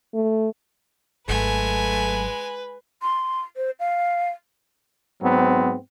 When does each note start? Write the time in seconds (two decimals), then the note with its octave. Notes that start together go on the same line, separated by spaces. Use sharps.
0.14 A3
1.29 G#1 F#3 G#3 A3 B4 G#5
3.02 C6
3.57 C5
3.80 F5
5.22 G#2 F#3 B3 C4